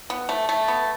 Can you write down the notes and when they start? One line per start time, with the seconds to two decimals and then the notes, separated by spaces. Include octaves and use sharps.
0.10 B3
0.29 A3
0.49 A3
0.68 B3